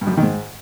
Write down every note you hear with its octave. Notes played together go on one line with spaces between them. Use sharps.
G2
F#2
G3
D#3
G#2